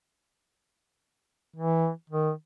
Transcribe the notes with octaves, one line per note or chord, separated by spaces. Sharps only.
E3
D#3